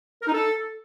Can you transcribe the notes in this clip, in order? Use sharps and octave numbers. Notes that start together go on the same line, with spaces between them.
A#4
D#4
A4